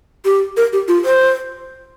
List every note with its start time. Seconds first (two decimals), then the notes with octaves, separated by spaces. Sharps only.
0.25 G4
0.57 A#4
0.73 G4
0.88 F4
1.05 C5